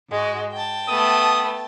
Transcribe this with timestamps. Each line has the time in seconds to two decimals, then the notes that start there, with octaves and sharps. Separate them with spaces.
0.10 G#2 G#3 F#4
0.52 G5 A5
0.89 A3 B3 D#6